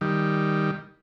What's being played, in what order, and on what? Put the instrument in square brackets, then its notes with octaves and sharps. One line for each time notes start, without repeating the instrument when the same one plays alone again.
[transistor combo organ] D#3 G3